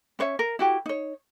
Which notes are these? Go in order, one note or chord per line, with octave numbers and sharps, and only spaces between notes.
C#4 C5 C#5 E5
A#4
E4 F#4 G4
D#4 C#5